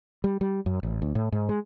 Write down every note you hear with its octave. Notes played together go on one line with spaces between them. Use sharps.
G3
G3
F#2
A1
D2
A2
G#2
G#3